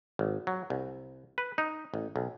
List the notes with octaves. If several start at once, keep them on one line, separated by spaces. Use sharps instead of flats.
G#1
F#3
C2
B4
D#4
A1
B1